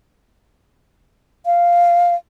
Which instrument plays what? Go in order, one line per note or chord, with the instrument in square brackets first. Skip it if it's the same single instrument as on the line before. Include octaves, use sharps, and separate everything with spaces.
[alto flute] F5